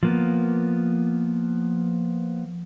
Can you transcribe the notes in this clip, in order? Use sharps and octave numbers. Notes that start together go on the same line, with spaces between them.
F3 A#3 B3